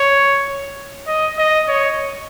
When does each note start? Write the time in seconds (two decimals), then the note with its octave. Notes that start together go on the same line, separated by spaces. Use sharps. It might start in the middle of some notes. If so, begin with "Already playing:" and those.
Already playing: C#5
1.07 D#5
1.38 D#5
1.68 C#5